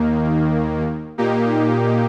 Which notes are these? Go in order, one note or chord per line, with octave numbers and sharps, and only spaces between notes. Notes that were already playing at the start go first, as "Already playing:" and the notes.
Already playing: D#2 D#3 A#3
A#2 A#3 D#4 G4